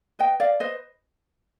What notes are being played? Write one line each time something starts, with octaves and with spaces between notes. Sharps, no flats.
B4 D#5 G5
D5 F5
B4 C5 D#5